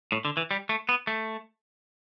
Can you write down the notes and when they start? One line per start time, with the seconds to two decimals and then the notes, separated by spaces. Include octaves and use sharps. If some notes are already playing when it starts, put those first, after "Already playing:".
0.12 A2
0.25 D3
0.37 E3
0.51 G3
0.69 A3
0.89 B3
1.07 A3